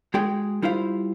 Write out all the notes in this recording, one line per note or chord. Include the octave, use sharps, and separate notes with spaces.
G#3 F#4 G#4 G5
G3 E4 F4 C5 F5